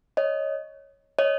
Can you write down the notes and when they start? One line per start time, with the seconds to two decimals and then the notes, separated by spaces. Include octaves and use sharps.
0.17 C#5 D#5
1.19 C#5 D#5